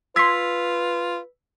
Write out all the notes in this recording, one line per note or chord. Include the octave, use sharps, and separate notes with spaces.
F4 B4 C6 E6 G#6 B6